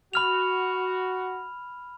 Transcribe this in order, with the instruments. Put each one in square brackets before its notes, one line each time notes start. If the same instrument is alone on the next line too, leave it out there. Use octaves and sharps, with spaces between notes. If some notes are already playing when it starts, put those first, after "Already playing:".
[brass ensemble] F#4 [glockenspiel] B5 F6 F7